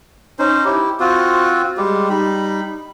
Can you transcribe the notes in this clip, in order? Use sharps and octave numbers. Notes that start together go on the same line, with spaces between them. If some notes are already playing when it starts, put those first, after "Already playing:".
C#4 D#4 C5
E4 G4
C4 F4 F#4
G3 G#3 G4
G3 D#4 B5